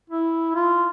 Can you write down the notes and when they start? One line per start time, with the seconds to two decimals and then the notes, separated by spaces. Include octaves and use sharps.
0.09 E4
0.55 F4